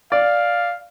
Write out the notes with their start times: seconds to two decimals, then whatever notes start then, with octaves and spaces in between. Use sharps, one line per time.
0.12 D5 F5